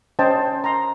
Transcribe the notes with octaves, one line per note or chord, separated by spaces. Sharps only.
C#4 C5 D#5 G5 A5
A#5 C6